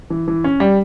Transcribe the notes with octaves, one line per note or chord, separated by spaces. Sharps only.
E3
E3
C#4
G3